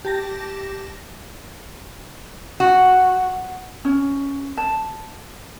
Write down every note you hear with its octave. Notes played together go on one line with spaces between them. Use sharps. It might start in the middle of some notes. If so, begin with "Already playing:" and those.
G4 A5 A#6
F#4
C#4
A5